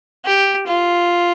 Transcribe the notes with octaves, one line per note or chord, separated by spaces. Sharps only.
G4
F4